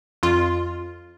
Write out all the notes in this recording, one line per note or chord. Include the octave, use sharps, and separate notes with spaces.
F2 F4